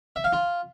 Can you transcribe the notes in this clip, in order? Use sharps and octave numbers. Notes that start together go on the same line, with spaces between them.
E5
F5
F4